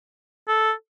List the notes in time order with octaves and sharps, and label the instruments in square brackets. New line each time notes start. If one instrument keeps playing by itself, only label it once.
[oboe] A4